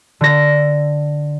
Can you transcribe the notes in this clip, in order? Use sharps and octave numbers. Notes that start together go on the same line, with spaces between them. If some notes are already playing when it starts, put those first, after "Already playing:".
D3 A#6